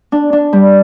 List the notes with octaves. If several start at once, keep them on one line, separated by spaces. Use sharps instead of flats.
D4
D4
G3